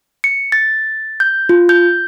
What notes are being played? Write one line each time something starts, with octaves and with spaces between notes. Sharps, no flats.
C#7
A6
G6
F4
G6